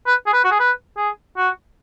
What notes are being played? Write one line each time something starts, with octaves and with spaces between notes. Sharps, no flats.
B4
G#4
B4
F#4
G#4
B4
G#4
F#4